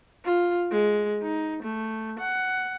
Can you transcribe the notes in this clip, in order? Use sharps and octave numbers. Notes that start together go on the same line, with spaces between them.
F4
G#3
D#4
A3
F#5